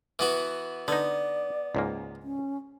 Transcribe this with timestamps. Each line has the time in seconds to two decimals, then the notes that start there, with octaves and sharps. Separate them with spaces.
0.19 E3 B3 F#4
0.88 D3 B3 D#4 D5
1.75 C#2 G#2 A#3
2.23 C#4